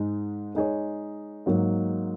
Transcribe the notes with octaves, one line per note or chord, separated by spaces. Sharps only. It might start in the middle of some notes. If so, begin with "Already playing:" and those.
Already playing: G#2 G#3 D#4
G#3 D#4 G#4 C#5
G#2 F#3 A#3